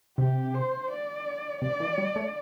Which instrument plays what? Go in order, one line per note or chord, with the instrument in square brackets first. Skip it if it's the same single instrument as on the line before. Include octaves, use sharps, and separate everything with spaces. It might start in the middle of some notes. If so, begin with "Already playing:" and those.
[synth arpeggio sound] C3 [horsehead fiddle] G4
[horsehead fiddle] C5
D5
[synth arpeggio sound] C3 [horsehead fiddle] D5
[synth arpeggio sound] E3
G3
A3